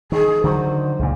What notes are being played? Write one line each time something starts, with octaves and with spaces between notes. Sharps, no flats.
D#3 G#4
D3 D#3 F#3 C5
C#2 A#2